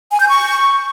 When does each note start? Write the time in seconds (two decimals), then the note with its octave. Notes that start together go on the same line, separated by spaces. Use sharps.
0.12 G#5
0.20 G6
0.29 C#6